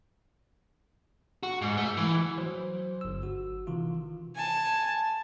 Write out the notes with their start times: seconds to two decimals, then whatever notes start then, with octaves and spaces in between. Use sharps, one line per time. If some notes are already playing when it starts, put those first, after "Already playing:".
1.43 F#4
1.62 G#2
1.77 A3
1.97 E3
2.38 F#3 C5
3.01 G1 E6
3.23 F#4
3.67 C3 D#3 E3 F4
4.35 G#5 A5